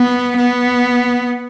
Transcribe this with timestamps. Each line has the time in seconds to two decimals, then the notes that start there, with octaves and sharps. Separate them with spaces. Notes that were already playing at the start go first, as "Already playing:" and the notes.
Already playing: B3
0.37 B3